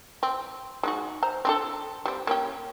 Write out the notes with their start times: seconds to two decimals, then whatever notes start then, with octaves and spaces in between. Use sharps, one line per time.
0.23 C4
0.83 G#3 D#4 F#4
1.23 C5 A#5
1.45 C4 D4 A4
2.06 G3 C4
2.27 A#3 C#4 G4